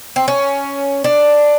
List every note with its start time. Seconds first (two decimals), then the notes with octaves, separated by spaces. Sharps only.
0.16 C4
0.28 C#4
1.04 D4